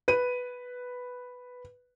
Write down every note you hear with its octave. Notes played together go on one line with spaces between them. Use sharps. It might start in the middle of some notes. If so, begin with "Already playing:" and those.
B4 D#7